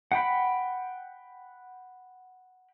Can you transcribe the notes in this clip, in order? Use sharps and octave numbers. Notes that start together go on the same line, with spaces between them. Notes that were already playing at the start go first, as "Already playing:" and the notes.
F#5 G5 B5